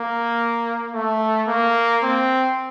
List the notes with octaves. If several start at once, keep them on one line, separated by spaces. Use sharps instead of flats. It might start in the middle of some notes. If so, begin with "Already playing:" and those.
Already playing: A#3
A3
A#3
C4